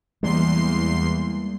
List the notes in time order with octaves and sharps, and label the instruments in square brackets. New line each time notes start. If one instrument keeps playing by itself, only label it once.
[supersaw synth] E2 C6 C7 [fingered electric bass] G3 G#3 A#3